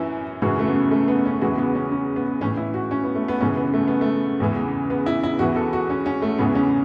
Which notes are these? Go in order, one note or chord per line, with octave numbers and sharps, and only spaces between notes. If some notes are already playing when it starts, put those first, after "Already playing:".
Already playing: F#2 E3 C#4 E4
F#2 C#3 E3 F#4
A3
B3
A3
B3
C#4
E2 C#3 E3 F#4
B3
C#4
C#4
B3
A2 E3 C#4
E4
F#4
C#4
B3
A3
B3
F#2 C#3 E3 C#4
B3
A3
B3
A3
E2 C#3 E3
B3
E4
E4
E2 E3 F#4
A4
F#4
C#4
C#4
A3
E2 C#3 E3 B3
C#4